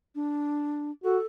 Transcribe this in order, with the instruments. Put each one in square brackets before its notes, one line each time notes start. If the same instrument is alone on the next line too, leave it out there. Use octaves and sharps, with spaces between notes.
[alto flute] D4
[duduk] F#4 [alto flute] A4